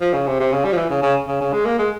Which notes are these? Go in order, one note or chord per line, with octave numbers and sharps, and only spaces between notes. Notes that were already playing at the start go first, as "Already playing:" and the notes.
F3
C#3
C3
C3
C#3
G3
F3
E3
C#3
C#3
C#3
C#3
G#3
A#3
G#3